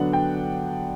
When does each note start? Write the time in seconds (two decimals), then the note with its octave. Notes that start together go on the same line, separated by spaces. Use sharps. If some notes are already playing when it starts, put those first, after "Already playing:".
Already playing: D3 F#3 B3 D4 F#5
0.13 G5